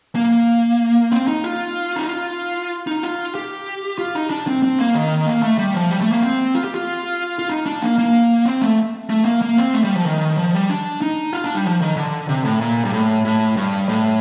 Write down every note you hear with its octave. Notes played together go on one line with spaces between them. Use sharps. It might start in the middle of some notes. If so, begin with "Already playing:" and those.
A#3
C4
D#4
F4
D#4
F4
D#4
F4
G4
F4
D#4
D4
C4
C4
A#3
D#3
A#3
A3
G3
F3
G3
A3
A#3
C4
F4
G4
F4
F4
D#4
D4
A#3
A#3
C4
A3
A3
A#3
A#3
C4
A3
G3
F3
D#3
F3
G3
D4
D#4
F4
D4
G3
F3
D#3
D3
C3
A2
A#2
G2
A2
A2
G2
A2